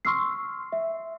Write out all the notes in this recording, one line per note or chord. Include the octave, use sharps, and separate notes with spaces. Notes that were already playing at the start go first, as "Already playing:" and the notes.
C6 C#6 E6 F6 C7
E5